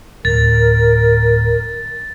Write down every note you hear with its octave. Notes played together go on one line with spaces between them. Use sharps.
D1 A#4 A6